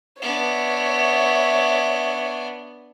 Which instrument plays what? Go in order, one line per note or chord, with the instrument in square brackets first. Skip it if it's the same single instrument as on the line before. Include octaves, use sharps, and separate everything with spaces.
[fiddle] B3 D4 [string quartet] C#5 E5